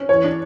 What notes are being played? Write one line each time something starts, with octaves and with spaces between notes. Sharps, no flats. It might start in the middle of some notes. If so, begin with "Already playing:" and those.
Already playing: C#4
E3 C#5
D4